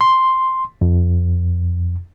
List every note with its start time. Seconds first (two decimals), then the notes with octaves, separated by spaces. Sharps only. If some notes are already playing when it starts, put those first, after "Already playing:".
0.01 C6
0.81 F2